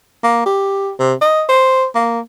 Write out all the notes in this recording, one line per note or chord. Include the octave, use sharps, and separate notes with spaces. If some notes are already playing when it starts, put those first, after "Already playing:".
A#3
G4
C3
D#5
C5
A#3